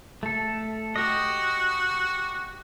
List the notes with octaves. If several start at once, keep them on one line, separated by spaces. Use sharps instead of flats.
A3 A4
F#4 G4 D#5